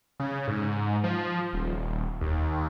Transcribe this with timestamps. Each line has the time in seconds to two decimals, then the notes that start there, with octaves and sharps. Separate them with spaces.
0.20 C#3
0.48 G#2
1.04 F3
1.53 D#1
2.21 D#2